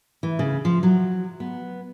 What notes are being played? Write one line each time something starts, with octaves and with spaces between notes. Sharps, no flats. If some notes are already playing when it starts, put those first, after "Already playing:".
E3
C#3
F3
F#3
B3